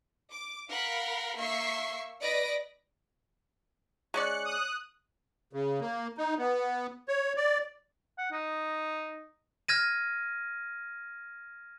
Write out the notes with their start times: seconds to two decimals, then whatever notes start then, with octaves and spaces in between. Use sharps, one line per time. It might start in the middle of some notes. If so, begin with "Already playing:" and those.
0.32 D6
0.69 A#4 F5 F#5 B5
1.37 A#3 E5 C#6 C7
2.21 B4 D5 D#5 A#6 D7
4.14 G#3 C#4 D5 F#6 C#7
4.45 D#6 F#6
5.53 C#3
5.80 A#3
6.17 D#4
6.38 B3
7.08 C#5
7.36 D5
8.18 F#5
8.32 D#4
9.68 F6 G#6 A#6 D#7